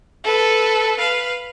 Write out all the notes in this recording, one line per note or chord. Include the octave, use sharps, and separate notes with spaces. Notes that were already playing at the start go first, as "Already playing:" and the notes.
A4 B4
B4 F5